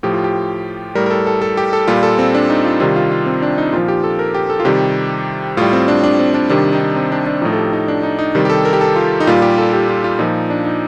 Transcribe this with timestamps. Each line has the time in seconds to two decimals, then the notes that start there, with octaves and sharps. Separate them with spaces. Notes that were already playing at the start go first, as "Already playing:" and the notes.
0.03 A2 F3 G4
0.14 F4
0.24 G4
0.95 A2 G3 A#4
1.06 A#4
1.10 A4
1.27 A4
1.42 A4
1.57 G4
1.73 A4
1.87 A#2 G3 F4
2.03 A4
2.18 C4
2.35 D4
2.50 D#4
2.65 F4
2.80 C3 D#3 G3 F4
2.96 F4
3.11 F4
3.26 C4
3.42 D4
3.58 D#4
3.73 A#2 F3 F4
3.88 G4
4.04 A4
4.19 A#4
4.35 G4
4.50 A4
4.60 F4
4.65 C3 D#3 G3 G4
5.57 A2 G3 F4
5.73 C4
5.88 D4
6.03 D4
6.19 C4
6.34 D4
6.50 C3 D#3 G3 D4
6.73 D#4
6.81 D4
6.96 C4
7.12 D4
7.26 D4
7.42 A2 F3 D#4
7.53 A4
7.57 G4
7.73 D#4
7.88 D4
8.03 D#4
8.19 D#4
8.35 C3 D#3 G3
8.45 G4
8.50 A4
8.65 A#4
8.73 G4
8.81 A4
8.96 F4
9.20 D#4
9.27 A#2 G3 F4
9.42 G4
9.58 A4
9.73 G4
9.89 F4
10.04 F4
10.19 A#2 F3 D#4
10.50 D4
10.65 D#4